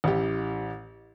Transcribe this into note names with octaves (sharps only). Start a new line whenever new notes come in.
A1 E4 G4